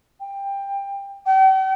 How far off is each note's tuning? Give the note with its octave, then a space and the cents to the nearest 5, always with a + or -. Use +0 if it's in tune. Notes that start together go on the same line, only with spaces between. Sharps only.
G5 +20
G5 -45